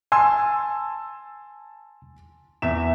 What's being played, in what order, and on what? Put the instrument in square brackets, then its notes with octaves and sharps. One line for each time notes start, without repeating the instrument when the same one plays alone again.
[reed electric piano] G#5 [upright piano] A5 C6 E6
[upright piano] E2 E5 E7